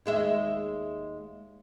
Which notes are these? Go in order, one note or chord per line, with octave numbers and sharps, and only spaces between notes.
D#2 G#3 E5